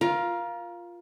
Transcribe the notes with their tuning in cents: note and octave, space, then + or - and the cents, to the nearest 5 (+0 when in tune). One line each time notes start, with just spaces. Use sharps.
F4 +0 A#4 +25 F5 +0